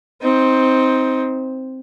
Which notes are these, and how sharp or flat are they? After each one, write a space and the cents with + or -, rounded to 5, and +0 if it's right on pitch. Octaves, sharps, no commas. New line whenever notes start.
C4 +0 D#4 +20